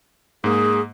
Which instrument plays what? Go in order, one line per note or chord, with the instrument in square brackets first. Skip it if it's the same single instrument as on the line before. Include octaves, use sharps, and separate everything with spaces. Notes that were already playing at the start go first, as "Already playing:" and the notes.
[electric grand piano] G#2 A#3 [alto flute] G#4